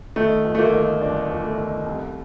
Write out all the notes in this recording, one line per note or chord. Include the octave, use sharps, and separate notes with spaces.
D#3 A3
G1
A3
A#3
D#3
G1 D4
G1
A3
D#3
C2